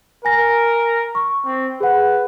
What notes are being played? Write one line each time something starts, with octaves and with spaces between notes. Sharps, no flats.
A#4 G#5 A#6
C#6
C4
G#4 B4 F#5